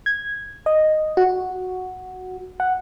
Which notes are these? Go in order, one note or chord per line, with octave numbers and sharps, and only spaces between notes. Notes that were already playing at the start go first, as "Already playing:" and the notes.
G#6
D#5
F#4
F#5